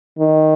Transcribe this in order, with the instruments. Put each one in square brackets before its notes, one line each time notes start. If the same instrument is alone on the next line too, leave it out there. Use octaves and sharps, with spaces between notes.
[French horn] D#3